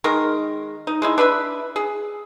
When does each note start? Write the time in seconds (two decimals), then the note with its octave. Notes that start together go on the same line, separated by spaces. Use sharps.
0.04 D#3 G#3 A#4
0.87 D#4
1.02 G#3 D#4 E4
1.18 D4 B4 E5 B5
1.76 G#4